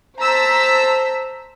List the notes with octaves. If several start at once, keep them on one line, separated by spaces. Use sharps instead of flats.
C5 A5 A#5 E6 B6